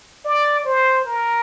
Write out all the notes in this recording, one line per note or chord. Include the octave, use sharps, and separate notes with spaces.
D5
C5
A#4